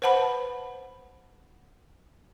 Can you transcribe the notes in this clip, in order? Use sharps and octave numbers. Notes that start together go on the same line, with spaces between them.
B4 C5 F#5 A5 B5